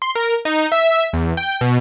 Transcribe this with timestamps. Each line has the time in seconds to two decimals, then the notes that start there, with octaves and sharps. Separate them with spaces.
0.02 C6
0.15 A#4
0.45 D#4
0.72 E5
1.13 E2
1.37 G5
1.61 B2